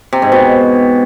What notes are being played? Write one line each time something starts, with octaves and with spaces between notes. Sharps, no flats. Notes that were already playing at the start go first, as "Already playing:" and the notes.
C3
G#2
B2